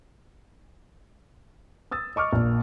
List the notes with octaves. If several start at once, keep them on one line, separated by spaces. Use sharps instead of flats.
D#6 E6 A6
D#5 C#6 D6 F6
A#1 A#3